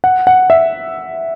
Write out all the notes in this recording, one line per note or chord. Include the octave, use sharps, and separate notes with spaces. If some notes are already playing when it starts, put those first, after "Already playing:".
F#5
F#5
E5